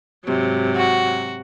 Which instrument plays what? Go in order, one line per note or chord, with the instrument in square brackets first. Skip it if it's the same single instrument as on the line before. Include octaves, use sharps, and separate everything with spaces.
[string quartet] G#2 C3 F#3
[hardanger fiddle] F#4